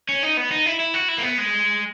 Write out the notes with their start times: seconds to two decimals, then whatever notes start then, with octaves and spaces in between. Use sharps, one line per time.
0.09 C#4
0.23 D#4
0.37 B3
0.51 D#4
0.66 E4
0.80 E4
0.94 F#4
1.08 E4
1.18 A#3
1.23 B3
1.38 G#3